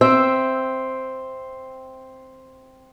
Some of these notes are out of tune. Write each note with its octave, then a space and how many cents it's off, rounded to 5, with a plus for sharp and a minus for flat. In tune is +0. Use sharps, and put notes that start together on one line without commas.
C4 +0 E5 +0 G5 +0